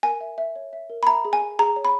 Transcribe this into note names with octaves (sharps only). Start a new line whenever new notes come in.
A#4 G#5
E5
E5
C#5
E5
A#4
B5
E5 A#5
G#4
G#5
G#4
G#4 A#5
C#5
B5